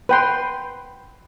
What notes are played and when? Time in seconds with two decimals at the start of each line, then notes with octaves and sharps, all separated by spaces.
0.09 B4 G5 C6